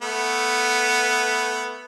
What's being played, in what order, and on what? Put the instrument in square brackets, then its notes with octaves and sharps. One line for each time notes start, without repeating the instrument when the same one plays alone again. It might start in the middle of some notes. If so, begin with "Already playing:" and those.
[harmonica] A3 B3